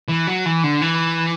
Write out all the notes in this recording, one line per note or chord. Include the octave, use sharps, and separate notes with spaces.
E3
F#3
E3
D3
E3